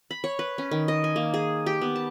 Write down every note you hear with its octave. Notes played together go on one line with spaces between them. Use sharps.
B5
C#5
B4
C#4
D#3
D#5
G#5
A#3
G#4
G4
B3
A5